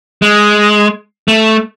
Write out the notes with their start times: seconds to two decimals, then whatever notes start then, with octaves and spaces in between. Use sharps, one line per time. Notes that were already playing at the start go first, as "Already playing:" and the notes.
0.22 G#3
1.28 A3